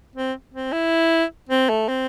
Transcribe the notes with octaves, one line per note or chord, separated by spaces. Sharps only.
C4
C4
E4
C4
A3
C4